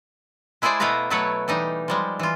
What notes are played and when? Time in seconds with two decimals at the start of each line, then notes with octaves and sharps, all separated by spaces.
0.62 G#3 E4 G#4 C5 D5 A5
0.80 B2 A3 E4 B4 F5 A#5
1.10 B2 F#3 A3 E4 B4 C#5
1.48 E3 G3 D#4
1.88 F3 G3 G#3
2.19 E3 F4